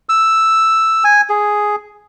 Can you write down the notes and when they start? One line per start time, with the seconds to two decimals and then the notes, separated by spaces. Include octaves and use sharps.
0.09 E6
1.04 G#5
1.29 G#4